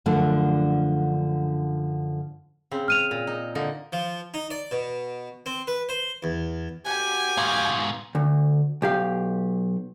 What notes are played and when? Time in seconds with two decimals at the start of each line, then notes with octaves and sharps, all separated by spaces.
0.06 F#2 D3 F3 A3 D4
2.71 C#3 C4
2.88 F6 D#7 F7
3.11 A#2
3.27 D#4
3.55 D3 A#3 D#4
3.93 F3
4.34 D#4
4.51 D5
4.71 B2
5.46 C4
5.67 B4
5.89 C5
6.23 E2
6.86 F#4 G4 F#5 G#5
7.37 G#2 B2 F5
8.15 D2
8.82 B1 G4 F5